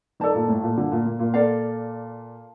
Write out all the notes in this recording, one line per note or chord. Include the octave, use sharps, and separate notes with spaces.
D#3 A4 D5 A5
A#2
A2
A#2
D3
A#2
A#2
A#2
A4 D5 F5